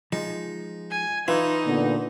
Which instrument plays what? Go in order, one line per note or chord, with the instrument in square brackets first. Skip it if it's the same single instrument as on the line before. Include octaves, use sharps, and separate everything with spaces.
[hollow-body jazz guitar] F3 G#3 [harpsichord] D#4
[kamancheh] G#5
[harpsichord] E3 [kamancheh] D#4 [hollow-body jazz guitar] F4
[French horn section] A#2 D3 B3